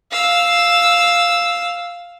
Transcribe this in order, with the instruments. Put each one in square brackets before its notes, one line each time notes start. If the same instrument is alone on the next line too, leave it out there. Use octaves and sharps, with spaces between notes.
[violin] F5 E6